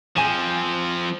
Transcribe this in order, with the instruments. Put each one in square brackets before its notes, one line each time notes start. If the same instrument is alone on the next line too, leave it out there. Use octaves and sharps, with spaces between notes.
[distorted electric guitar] F3 C4 [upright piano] G#5 D#7 E7